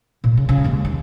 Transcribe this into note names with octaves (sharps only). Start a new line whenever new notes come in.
A#2
C#3
C#3
D#2 G#3
D#3